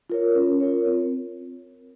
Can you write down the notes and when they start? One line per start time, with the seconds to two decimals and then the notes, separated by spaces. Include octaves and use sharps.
0.10 F4 A#4 C#5
0.35 C#4
0.60 F4 A#4 C#5
0.86 C4